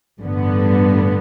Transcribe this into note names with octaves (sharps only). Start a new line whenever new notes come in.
A1 G2 D3 G3 B3